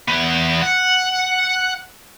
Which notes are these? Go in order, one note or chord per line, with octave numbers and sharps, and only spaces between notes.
E2 B3
F#5